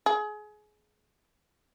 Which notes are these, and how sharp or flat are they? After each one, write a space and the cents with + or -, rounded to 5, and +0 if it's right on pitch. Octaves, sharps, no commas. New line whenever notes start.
G#4 +25